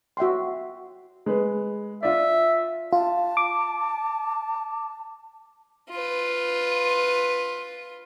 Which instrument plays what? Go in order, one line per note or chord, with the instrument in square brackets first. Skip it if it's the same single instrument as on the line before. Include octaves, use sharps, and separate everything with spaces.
[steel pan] F#4 E5 G5 C6
[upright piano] G#3 B4
[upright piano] F4 D5 [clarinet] E5
[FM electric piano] F4 [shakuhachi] A5
[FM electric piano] D6
[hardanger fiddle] F4 B4